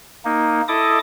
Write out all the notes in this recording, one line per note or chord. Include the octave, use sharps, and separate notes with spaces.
A#3 D#4
E4 A4 D#5 D6 D#6